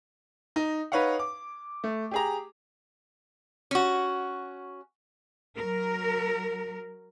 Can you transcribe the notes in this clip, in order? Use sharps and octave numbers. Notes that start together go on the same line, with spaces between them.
D#4
D#4 B4 C#5 F5 F#5
D6
A3
G4 G#4 A#5
C#4 F#4
F#3 A#4